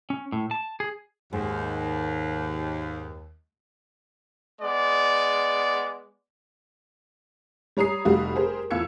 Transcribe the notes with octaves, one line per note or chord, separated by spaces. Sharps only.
C#4
A2
A5
G#4
D#2 G#2
G#3 B3 D5
G3 C#5 A#5 D#6 C7
F1 G3 A3 F#4 F5
G4 G#4 A#4 C5
E2 A2 F4 E6 G#6 C#7